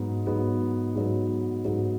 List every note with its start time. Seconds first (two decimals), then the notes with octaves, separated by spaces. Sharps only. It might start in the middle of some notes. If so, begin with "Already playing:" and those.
Already playing: G#2 F#3 B3
0.27 G#2 F#3 B3
0.95 G#2 F#3 B3
1.65 G#2 F#3 B3